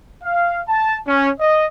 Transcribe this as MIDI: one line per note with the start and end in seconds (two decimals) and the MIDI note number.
0.23 0.60 77
0.68 0.97 81
1.06 1.28 61
1.40 1.65 75